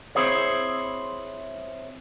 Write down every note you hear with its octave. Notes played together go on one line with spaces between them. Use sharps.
C4 E4 G#4 C5 C#5